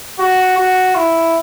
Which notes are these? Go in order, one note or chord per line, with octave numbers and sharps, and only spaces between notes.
F#4
F#4
E4